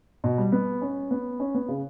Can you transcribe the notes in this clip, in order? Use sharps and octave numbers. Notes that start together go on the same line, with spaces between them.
B2
G3
B3
C#4
B3
C#4
B3
C#3